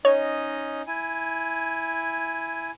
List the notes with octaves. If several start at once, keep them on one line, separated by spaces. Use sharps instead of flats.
C#4 D#4 C#5 D#5
E4 G#5